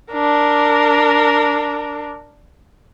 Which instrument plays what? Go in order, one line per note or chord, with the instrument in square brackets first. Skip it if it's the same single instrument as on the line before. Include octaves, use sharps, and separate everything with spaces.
[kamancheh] D4 A#4